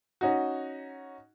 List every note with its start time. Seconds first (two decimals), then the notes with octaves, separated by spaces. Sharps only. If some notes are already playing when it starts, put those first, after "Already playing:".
0.21 C#4 D#4 F#4